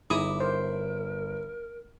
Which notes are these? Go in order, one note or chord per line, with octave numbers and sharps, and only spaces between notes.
G1 D#4 E4 G#4 D6 D#6
A#4 C5